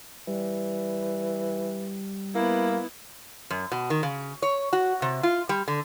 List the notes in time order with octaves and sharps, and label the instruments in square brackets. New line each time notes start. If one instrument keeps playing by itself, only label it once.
[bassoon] E3 [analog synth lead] G3
[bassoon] A#3 [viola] B3 E4
[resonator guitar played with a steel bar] F#2
B2
D#3
C#3
C#5
F#4
C3
F4
G3
D3